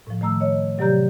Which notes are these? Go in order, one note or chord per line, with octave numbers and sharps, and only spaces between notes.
A2 F3
D#3 A3 A#5 E6
C#5 D#5
C3 F#3 G4 D5 A#5 G6